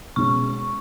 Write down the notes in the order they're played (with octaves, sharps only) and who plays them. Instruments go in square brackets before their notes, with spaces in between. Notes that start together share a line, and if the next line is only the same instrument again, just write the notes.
[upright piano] B2 G#3 C#4 [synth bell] C#6